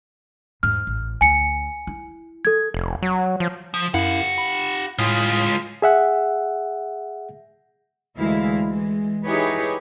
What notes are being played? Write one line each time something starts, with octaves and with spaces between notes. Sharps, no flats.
E2 G#2 F6
A1
D2 G#5 C#7
E4
A4 G#6
F1
F#3
F3
F3
F#2 E4 G4 F5 F#5
B5
A2 G#3 F4 D#6 B6
G#4 E5 F#5
D2 E3 G#3 E4 F5
E3 G#3
D#4 E4 G4 G#4 B4 C#5